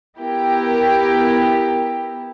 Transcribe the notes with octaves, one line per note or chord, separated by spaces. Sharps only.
B3 E4 G4 A#4